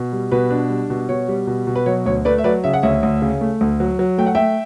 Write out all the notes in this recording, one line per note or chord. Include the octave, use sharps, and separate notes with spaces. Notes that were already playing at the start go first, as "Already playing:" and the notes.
Already playing: B2
G3
B2 B4
D4
G3
B2
B2 C#5
G3
B2
B2
B4
F#3 C#5
D2 C#5
A3 B4 D5
E5
F#3 B4 D5
C#3 E5
F#5
D2 C#5 E5
D2
C#3
A3
D2
F#3
F#3
A3 G5
F#5
A3 E5 G5